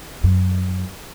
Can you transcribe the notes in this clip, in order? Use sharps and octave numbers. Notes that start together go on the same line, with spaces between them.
F#2